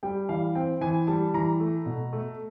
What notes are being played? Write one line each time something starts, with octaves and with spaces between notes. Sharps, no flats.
G3 G5
E3 F5
C4 G5
E3 G#5
G3 A5
E3 A#5
A3
B2
A3